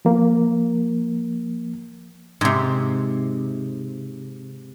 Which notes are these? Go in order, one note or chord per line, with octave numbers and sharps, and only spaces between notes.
F3 A#3
G#2 C3